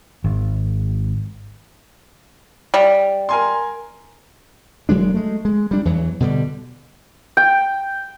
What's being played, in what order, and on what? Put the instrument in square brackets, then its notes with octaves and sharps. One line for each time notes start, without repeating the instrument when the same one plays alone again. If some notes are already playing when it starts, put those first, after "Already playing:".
[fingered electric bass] G#1
[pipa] G3
[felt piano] A#4 G#5 C6
[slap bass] E1 F#3 G#3 D4
G#3 A3
G#3
G3 D4
E2 E3 F#3
B2 D3 F3 G3
[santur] G5